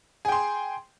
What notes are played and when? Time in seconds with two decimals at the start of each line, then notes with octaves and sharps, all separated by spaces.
0.25 G#4
0.28 G5
0.32 C6